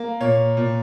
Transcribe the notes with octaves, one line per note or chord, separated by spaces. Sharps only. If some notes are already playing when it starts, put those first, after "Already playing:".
Already playing: A#3
A#2 C#5
A#2